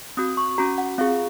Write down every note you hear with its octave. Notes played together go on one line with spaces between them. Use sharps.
C4 F#4 D#6
C#6
C#4 F#4 A#5
F#5
C4 F4 G#4 F5